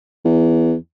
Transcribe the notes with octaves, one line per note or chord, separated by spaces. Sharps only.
E2